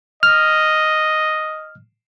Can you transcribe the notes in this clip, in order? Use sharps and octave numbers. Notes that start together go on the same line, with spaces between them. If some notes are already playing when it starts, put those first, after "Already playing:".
D#5 F6